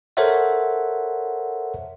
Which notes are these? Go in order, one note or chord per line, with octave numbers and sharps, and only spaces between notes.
A4 A#4 C5 C#5 E5 F#5